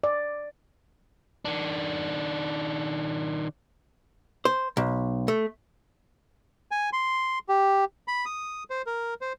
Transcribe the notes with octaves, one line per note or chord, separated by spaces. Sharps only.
D5
D#3 D4
C5
B1
A3
G#5
C6
G4
B5
D#6
C5
A#4
C5